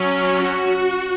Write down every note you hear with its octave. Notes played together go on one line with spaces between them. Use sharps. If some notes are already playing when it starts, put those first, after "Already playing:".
Already playing: F#3 C#4
F#4